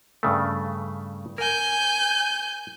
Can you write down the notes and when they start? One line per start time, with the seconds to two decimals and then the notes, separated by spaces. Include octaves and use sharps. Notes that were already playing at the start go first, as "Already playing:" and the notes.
0.23 G2 C#3 A3
1.38 A#4 G#5 G6